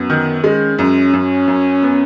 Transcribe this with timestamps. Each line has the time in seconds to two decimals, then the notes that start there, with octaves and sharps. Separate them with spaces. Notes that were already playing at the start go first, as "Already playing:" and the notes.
Already playing: F#2 B3
0.10 D#3
0.44 G#3 C#4
0.79 F#2 C#4
1.13 F#2
1.48 F#2
1.82 B3